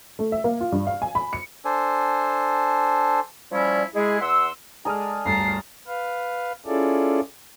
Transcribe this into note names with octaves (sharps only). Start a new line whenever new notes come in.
A3
E5
A#3
F4
G2
F5
G#5
B5
C#7
D4 A4 C5 G#5
F3 G3 C#4 E4 C#5 D5
G#3 E4 G#4
E2 F#5 C6 E6
G#3 G#4 A4 D5 A#5 D#6 F6
G1 D2 G2 A5 A#5 C7
B4 F5
C#4 E4 F4 G#4 A4 D5